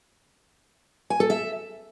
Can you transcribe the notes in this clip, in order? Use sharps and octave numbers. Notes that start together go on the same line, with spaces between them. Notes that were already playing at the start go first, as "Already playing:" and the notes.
G#5
A4
E5